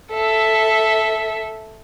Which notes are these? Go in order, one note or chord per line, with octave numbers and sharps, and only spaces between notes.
A4 E5